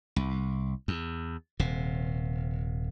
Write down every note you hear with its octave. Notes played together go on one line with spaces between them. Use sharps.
C2
E2
D#1 C3